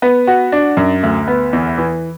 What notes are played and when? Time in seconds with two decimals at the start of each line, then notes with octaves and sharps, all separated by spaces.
0.02 B3
0.27 F#4
0.52 D4
0.77 F#2
1.03 D2
1.28 B3
1.53 E2
1.78 E3